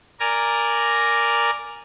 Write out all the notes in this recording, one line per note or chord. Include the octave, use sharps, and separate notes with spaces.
A#4 D5 G#5 A#5